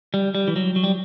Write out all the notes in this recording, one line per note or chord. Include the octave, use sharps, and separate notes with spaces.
G3
G3
E3
F#3
F#3
G3